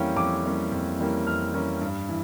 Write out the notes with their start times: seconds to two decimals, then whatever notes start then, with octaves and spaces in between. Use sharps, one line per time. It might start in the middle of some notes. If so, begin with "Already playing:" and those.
Already playing: F2 E3 G3 A#3 C#4 F5 G5
0.16 F2 D6
0.44 E3 G3 A#3 C#4
0.72 F2
0.99 E3 G3 A#3 C#4
1.27 F2 F6
1.54 E3 G3 A#3 C#4
1.81 G2
2.09 E3